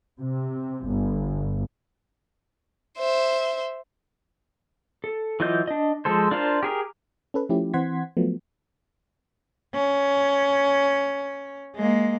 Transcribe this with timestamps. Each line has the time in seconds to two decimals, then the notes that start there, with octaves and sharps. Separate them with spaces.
0.19 C3
0.85 G1
2.98 C5 E5
5.04 A4
5.40 E3 F#3 F4 D#5 G6
5.67 D4 D#5
6.05 F3 G#3 A4 C5
6.31 D4 F4 A#4 C5 F5
6.63 G4 G#4 A#4
7.34 C#4 A4 B4
7.49 F3 A3 C#4 E4 G4
7.74 E3 C4 F#5 C6 G#6 B6
8.17 F3 F#3 A3 B3
9.75 C#4
11.76 G#3 A#3